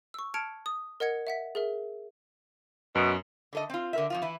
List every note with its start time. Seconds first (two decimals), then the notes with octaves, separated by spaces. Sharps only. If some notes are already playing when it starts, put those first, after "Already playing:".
0.14 C#6 E6
0.34 A5 F6 G#6 C#7 D7 F7
0.66 D#6
1.00 A#4 D#5 F#5 G#6 C#7
1.27 E5 F#5 B6
1.55 G#4 A#4 E5
2.95 F#2 B2
3.53 D3 A4 D#5
3.70 C4 F4
3.93 D3 A#4 E5
4.10 F2 F3 F4
4.22 E3 E4